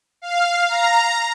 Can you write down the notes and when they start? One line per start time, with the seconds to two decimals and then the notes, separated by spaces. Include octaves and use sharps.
0.22 F5
0.69 A#5